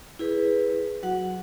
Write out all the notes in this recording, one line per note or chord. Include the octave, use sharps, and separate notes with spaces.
E4 G#4 B4
F#3 F#4 F#5